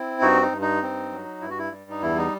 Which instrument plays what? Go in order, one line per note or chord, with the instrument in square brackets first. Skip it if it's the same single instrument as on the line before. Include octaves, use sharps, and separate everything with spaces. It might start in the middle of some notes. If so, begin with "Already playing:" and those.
Already playing: [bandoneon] C4 E4
G2 D#4 F#4
D#4
G2
D#4
C4
F#3
G2 E4
F#4
E4
G3
D#4
E2 E4
D#4